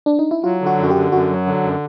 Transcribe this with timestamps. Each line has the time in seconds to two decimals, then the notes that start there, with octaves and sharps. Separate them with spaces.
0.06 D4
0.19 D#4
0.31 E4
0.44 F#3 F4
0.61 D3
0.66 F#4
0.79 F#2 F#4
0.90 G4
0.95 D3
1.12 F#2 F#4
1.30 F#3
1.46 D3
1.63 F#2